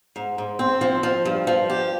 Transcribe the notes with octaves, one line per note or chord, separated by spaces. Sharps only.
G#2
G#2
C4
F3
F3
G2
F3
G4